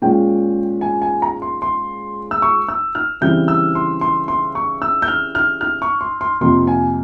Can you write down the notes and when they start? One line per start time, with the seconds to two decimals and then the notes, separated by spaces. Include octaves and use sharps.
0.02 A#2 G#3 C#4 G5
0.81 G#5
1.02 G#5
1.22 A#5
1.42 C6
1.62 C6
2.31 E6
2.42 C#6
2.68 E6
2.95 F6
3.21 C#3 E3 G3 C4 G6
3.48 E6
3.75 C6
4.01 C6
4.28 C6
4.55 C#6
4.82 E6
5.02 G6
5.08 F6
5.35 F6
5.61 F6
5.82 C#6
6.01 C6
6.21 C6
6.41 F2 C3 F3 A#3 C6
6.67 G#5